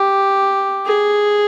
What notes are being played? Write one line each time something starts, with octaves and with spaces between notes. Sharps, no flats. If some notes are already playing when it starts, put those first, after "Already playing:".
Already playing: G4
G#4